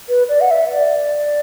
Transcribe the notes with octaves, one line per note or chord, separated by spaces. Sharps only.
B4
D5
F#5
E5
D5